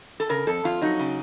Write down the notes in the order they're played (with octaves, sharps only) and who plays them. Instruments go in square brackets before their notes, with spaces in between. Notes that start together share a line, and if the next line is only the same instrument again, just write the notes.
[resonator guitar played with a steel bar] A4
C#3 A#4
F2 A4
F2 F4
F#3 D#4
C#3